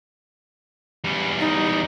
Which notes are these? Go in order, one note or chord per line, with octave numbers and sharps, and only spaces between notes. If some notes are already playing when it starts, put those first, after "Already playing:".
E2 G3
D#4